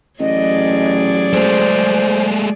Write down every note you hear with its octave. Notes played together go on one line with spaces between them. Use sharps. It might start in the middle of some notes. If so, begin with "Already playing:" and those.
A1 F#3 G#4 D5 D#5
G#3 A3 C5